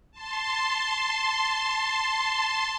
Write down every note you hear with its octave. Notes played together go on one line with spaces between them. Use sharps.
A5 C6